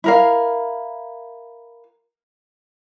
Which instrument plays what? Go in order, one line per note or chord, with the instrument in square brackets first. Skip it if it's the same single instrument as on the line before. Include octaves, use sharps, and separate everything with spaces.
[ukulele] E4 A#4 F5